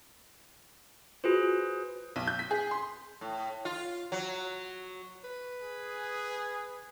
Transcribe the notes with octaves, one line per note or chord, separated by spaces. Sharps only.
F4 F#4 G#4 B4 C5
B1
G6
B6
G#4
C6
A2
F4
F#3
B4
G#4